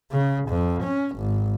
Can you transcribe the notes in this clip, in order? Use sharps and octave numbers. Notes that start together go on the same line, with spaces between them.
C#3
F2
C#4
G#1